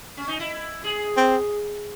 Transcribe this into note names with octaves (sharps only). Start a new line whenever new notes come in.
C#4
D#4
E4
G#4
C4